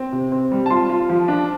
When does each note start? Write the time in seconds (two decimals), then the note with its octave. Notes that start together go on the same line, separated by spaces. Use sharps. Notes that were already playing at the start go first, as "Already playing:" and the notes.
Already playing: C4
0.13 C3
0.32 C4
0.52 G3
0.66 A5
0.70 F4 C6
0.89 F4
1.09 F3
1.28 D4